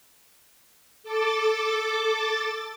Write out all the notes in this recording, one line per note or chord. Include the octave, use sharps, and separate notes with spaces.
A4 D6 A6